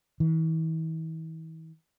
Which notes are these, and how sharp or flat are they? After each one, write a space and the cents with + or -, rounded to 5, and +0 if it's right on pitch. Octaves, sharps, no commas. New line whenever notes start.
E3 -40